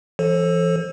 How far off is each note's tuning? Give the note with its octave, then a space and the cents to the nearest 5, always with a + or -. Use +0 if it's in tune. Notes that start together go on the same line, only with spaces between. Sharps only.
E3 +40 A4 +0 C5 +40